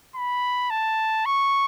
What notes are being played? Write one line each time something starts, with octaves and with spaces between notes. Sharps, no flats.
B5
A5
C#6